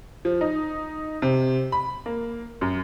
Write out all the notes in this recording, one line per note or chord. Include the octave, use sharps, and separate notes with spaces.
F3
D#4
C3
B5
A#3
F#2